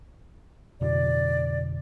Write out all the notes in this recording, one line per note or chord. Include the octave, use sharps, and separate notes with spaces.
F2 B2 D3 D5